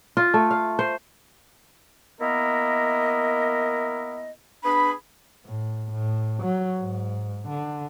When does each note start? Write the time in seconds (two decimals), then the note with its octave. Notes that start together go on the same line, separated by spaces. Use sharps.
0.17 F4
0.34 A3
0.51 F5
0.79 C5
2.21 A#3 B3 E4 A#4 D#5
4.65 B3 D4 G#4 B5
5.46 A2
5.92 A2
6.43 F#3
6.79 G#2
7.49 D3